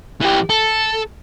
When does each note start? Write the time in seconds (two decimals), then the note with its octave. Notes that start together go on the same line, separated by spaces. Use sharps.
0.21 E3 G4
0.49 A4